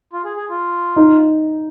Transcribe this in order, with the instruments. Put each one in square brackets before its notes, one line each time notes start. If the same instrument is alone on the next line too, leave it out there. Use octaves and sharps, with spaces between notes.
[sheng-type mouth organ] F4
G#4
G#4
F4
[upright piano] D#4